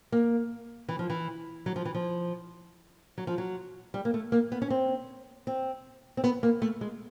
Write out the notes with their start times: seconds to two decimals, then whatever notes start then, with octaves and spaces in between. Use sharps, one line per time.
0.12 A#3
0.89 E3
0.99 F3
1.10 E3
1.66 F#3
1.76 F3
1.85 E3
1.95 F3
3.18 F#3
3.27 F3
3.38 F#3
3.94 G3
4.05 A#3
4.14 A3
4.32 A#3
4.52 B3
4.62 C#4
4.70 C4
5.47 C4
6.17 C4
6.24 B3
6.43 A#3
6.62 A3
6.81 G#3